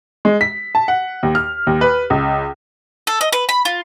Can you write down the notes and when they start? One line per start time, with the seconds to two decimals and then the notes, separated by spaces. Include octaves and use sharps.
0.25 G#3
0.41 B6
0.75 A5
0.88 F#5
1.23 D#2
1.35 F6
1.67 D#2
1.81 B4
2.10 C#2
3.07 A4
3.21 D#5
3.32 B4
3.49 B5
3.65 F4